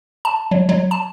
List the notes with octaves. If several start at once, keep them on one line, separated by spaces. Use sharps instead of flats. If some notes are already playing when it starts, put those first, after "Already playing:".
A5
F#3
F#3
A5